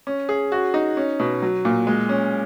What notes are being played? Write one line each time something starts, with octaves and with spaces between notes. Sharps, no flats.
C#4
G#4
F#4
D#4
C#4
B2
F#3
A#2
G#3
C#4